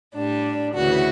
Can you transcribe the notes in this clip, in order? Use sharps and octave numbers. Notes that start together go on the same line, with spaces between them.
A2 G3 D4
D2 C#3 E3 F#4